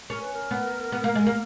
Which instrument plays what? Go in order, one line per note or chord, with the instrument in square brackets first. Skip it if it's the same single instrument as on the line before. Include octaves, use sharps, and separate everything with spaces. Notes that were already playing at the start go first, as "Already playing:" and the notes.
[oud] C#4 [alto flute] A#4
[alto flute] B4
A#4
[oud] B3
B3
A#3
G#3
A#3